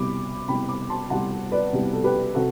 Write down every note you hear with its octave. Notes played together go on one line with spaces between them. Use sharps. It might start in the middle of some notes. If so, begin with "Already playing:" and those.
Already playing: C2 B2 G3 B5 D6
C2 B2 G3 G5 B5
B5 D6
A5 C6
C2 B2 G3 F#5 A5
B4 D5
C2 B2 G3
A4
G4 B4
C3 F#4 A4